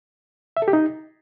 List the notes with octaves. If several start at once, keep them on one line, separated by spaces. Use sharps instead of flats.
E5
A4
G4
D#4